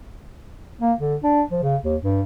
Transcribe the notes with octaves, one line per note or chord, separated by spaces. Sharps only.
A#3
D3
D4
F3
C#3
D#2
G2